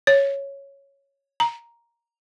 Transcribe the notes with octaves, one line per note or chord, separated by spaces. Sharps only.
C#5
A#5